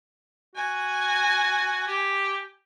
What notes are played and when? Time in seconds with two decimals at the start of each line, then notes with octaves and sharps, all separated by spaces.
0.55 F#4 G#5
1.87 G4